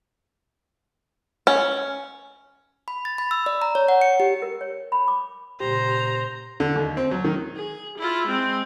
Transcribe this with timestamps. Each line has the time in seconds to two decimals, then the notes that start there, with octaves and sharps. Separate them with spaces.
1.47 C#4
2.88 B5
3.05 A6
3.18 B5
3.31 E6
3.46 D5
3.62 A#5
3.75 C#5
3.88 F#5
4.01 C#7
4.20 G4
4.42 A#4
4.61 C#5
4.92 B5
5.08 D6
5.60 A#2 C#3 G4 C5 A#5
6.60 D3
6.75 D#2
6.97 C4
7.11 F#3
7.24 D#3
7.56 G#4
7.98 E4 F4
8.28 G#3 C4